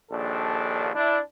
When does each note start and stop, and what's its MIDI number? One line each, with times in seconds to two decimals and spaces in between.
0.12 0.89 34
0.12 0.89 39
0.12 0.89 62
0.12 0.89 69
0.94 1.19 62
0.94 1.19 64